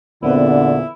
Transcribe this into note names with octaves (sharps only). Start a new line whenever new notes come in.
E2 A#2 D3 B3 C4 E4 B4 D5